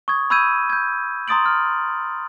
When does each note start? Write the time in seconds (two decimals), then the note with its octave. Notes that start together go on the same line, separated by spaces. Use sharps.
0.08 C#6 D#6 G#6
0.30 B5 C#6 E6 G6 G#6 D#7
0.70 G6 G#6
1.28 A#5 C6 D#6 A6 D7 F#7
1.46 F6